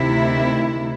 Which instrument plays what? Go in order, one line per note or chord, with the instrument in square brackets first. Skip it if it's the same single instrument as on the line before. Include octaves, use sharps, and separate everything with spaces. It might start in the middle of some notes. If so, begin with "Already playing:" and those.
Already playing: [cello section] D2 C3 D#3 E4